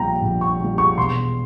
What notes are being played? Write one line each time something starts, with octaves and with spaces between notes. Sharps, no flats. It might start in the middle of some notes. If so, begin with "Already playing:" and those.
Already playing: A#1 A#2 G3 G5 A#5
A#1
C#6
A#2 G3
C#6
E1 C6